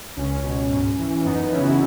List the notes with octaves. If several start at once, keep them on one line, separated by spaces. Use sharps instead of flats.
C#2 C#4
B2
G#2
E3
F#2 B3 D#4
C#3 E3 C#4 E4
F#4
E4